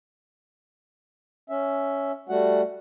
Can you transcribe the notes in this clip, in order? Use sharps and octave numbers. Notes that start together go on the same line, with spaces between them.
C#4 E5
G3 A3 F#4 F#5